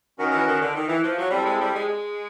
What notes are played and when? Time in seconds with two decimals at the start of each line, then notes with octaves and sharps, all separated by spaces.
0.18 D#3 C#4 F#4 A#4 D#5 F#5
0.32 E3
0.47 D#3
0.61 D3
0.75 D#3
0.88 E3
1.03 F3
1.18 F#3
1.31 G3 C4 E4 A4
1.45 G#3
1.59 G3
1.74 G#3
1.88 G#3